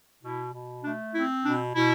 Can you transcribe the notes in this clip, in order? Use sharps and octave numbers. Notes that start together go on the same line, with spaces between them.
B2 E4
B2
A3 D4
C4 E4
B2 D4
B2 E4